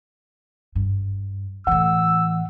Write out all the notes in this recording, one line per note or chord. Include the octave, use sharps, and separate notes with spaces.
G2
A2 E3 F#5 E6